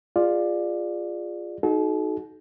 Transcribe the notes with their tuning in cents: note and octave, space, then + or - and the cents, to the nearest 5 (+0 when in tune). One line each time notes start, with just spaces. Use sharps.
F4 +5 G#4 -15 D5 +15
D#4 +0 F#4 +0 A4 -40